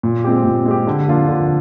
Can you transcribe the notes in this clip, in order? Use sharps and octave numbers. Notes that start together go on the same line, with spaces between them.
A#2
G#3 C4 G4
A#2
G#3 C4 G4
D3
F3 A#3 D4 F4
D3